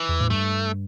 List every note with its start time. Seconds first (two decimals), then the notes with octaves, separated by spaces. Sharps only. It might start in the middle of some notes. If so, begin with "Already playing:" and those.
Already playing: E3
0.09 E2
0.20 A2
0.30 G2 A3